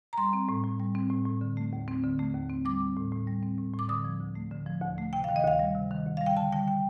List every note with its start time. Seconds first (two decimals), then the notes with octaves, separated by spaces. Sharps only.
0.13 A#5
0.18 G3 C6
0.33 C4
0.49 A2
0.64 A2
0.80 G3
0.95 C4
1.10 A2
1.26 A2
1.41 D3
1.57 A3
1.73 D#2
1.88 C4
2.03 D3
2.19 A3
2.35 D#2
2.50 C4
2.65 G3 D6
2.81 C4
2.96 A2
3.12 A2
3.27 G3
3.43 C4
3.58 A2
3.74 A2
3.79 D6
3.89 D3 D#6
4.05 F3
4.20 D2
4.35 A3
4.51 D3
4.66 F3
4.82 D2
4.98 A3
5.13 C3 G5
5.24 D#3 F5
5.36 D#5
5.43 D2 F5
5.59 G3
5.75 C3
5.91 D#3
6.06 D2
6.17 G3 F5
6.26 G5
6.37 D3 A5
6.52 G3 G5
6.68 G5